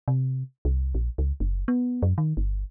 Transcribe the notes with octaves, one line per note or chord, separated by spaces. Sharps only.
C3
C2
A#1
C#2
F#1
B3
F#2
D#3
G1